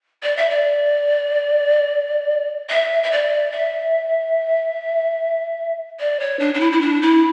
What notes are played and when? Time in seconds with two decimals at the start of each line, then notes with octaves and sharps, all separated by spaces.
0.23 D5
0.37 E5
0.49 D5
2.70 E5
3.03 E5
3.11 D5
3.52 E5
5.99 D5
6.20 C#5
6.39 D4
6.54 D4
6.60 E4
6.72 E4
6.81 D4
7.02 E4